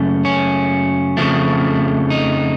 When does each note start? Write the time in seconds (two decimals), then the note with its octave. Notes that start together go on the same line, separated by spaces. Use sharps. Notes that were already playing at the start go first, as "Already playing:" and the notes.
Already playing: F#2 C#3 A3
0.25 C#4
1.17 F2 C#3 F3 A3
2.10 D#4